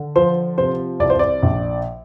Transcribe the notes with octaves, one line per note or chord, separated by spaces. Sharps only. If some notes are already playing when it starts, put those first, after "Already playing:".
Already playing: D3
F3 C5
C3 C5
C2 D5
C5
D5
A#1